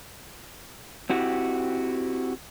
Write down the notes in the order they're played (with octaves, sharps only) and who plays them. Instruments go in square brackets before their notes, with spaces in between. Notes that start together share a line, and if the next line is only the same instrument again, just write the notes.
[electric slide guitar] C4 E4 F#4 G4